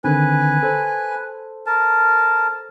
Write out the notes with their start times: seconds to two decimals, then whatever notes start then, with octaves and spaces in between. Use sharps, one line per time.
0.04 D3 D#3 C4 B4 G#5
0.63 A4 C5
1.66 A#4 A5